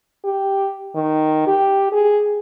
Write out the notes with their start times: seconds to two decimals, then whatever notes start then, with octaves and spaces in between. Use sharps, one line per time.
0.25 G4
0.95 D#3
1.47 G4
1.92 G#4